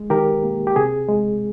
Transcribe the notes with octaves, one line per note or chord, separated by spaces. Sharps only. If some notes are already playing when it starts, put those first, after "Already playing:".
Already playing: G#3
D#3 G4 A#4
A#3
G4
C3 G#4
G#3